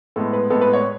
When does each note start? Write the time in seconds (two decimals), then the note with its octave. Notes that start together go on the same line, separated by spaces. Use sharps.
0.16 A2 G#3 B3 A4
0.33 B4
0.50 A2 G#3 B3 A4
0.61 B4
0.73 C#5